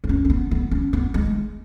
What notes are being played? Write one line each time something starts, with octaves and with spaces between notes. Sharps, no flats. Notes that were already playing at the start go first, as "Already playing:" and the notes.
B3
C#4
C#4
B3
B3
C#4
B3
G#3